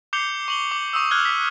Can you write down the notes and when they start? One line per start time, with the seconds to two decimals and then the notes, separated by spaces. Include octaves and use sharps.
0.13 D6 G6 C7 C#7 F7 G7
0.48 C#6 F#7 G7
0.71 D6
0.93 C#6 D#6 E6
1.11 F6 F#6 G#6 G7
1.25 B6